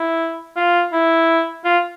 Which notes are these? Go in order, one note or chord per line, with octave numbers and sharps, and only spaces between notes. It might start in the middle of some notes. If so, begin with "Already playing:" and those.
Already playing: E4
F4
E4
F4